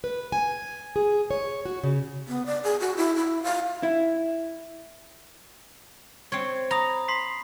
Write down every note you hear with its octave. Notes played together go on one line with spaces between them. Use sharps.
B4
G#5
G#4
C#5
F#4
C#3
B3
D5
G#4
F#4
E4
E4
F5
E4
C4 C#5
A#5 B5 D#6
C6 B6 C7